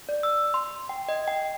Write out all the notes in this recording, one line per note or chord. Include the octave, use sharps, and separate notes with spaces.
D5
E6
C6
G5
D#5
G5